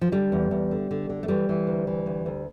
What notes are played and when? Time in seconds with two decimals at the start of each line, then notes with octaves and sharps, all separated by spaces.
0.01 F3
0.12 D3 G3
0.32 E2
0.51 E2
0.71 D3
0.91 D3
1.10 D3
1.23 A3
1.28 E3 G3
1.49 E3
1.67 D2
1.87 E3
2.06 D2
2.26 D2